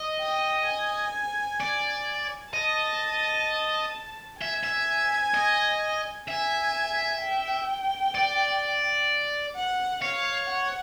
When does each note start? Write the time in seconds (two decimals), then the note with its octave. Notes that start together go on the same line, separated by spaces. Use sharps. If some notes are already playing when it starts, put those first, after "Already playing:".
Already playing: D#5
0.19 G5
0.67 G#5
1.60 D5
2.53 D#5 A5
4.40 E5 G#5
4.64 E5
5.34 D#5
6.28 E5 G#5
7.22 G5
8.15 D5
9.56 F#5
10.02 C#5 F5
10.49 F#5